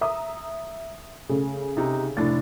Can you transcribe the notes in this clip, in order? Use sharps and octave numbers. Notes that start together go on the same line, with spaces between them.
E5 A#5 D#6
C#3 A3
C3 D#4
F1 A2 D4 A6